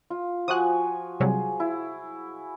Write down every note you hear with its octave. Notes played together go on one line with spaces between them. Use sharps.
F4
F3 F#4 G#5 D#6 F#6
C3 F#3 G3 G#4
E4